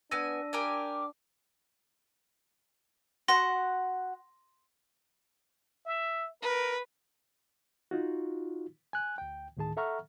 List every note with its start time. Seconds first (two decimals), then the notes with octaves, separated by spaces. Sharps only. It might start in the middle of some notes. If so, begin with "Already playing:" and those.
0.11 B3 D4 G#5 E6 A#6 D#7
0.53 G4 A#4 G#5 D6
3.28 F#4 F#5 C6 A#6
5.86 E5
6.42 A#4 B4
7.91 D#4 F4 F#4
8.93 G#5 F#6
9.18 D2 G5
9.57 D2 A2 D#3 G#4 A5
9.77 A4 E5 F#5 A#5 C#6 F6